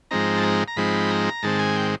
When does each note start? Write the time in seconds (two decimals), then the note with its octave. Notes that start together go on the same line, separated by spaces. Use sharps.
0.11 G#2 F3 G#3 C4 D#4 A#5
0.37 A5
0.43 A#5
0.68 A#5
0.76 G#2 F3 G#3 C4 D#4 B5
1.10 A#5
1.43 G#2 D#3 G#3 C4 A5
1.59 G#5
1.76 G5